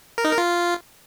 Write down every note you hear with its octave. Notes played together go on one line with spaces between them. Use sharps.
A#4
D#4
A#4
F4